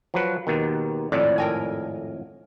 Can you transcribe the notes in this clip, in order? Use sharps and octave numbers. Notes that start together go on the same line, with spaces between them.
F3 F#3 B4
D#2 B2 D#3
G#1 F2 A2 D5
A#4 G5 G#5